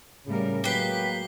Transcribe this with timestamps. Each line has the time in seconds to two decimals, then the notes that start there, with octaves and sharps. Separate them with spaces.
0.26 A2 C#3 G3 A#4
0.64 F#3 G#3 A#3 G4 B4 B6 C7 G7